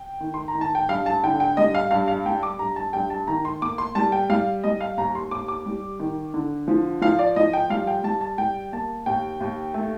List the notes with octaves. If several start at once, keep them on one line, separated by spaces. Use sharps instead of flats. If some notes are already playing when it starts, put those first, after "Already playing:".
Already playing: G5
D#3
C6
A#5
D#3
A5
G5
G2 F5
A5
D3 G5
G5
G3 D#5
F5
G2 F5
F5
G3 G5
D6
G2 A#5
A5
G2 G5
A5
D#3 A#5
C6
A#3 D6
C6
G3 A5
G5
G3 F5
G3 D#5
F5
D#2 A#5
C6
D#2 D6
D6
G3
D#3
D3
F3
F3 F5
D5
F3 D#5
G5
G3 F5
G5
G3 A5
A5
G3 G5
A#3 A5
D#2 G5
D#2
A3